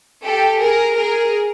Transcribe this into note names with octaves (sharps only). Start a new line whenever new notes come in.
G4 A4
G#4 A#4
G#4 A#4